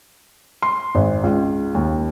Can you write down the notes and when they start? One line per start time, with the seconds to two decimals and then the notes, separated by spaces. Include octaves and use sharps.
0.62 C6
0.95 G#1
1.23 C#2
1.75 D#2